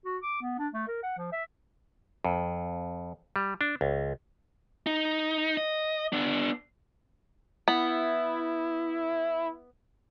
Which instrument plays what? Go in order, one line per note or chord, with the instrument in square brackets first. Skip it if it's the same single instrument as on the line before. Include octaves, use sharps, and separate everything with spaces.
[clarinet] F#4
D6
B3
D4
A3
A#4
F#5
F3
E5
[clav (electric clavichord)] F2
G3
D4
C#2
[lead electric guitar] D#4
D#5
B3 D4
[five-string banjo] B3 [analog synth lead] E4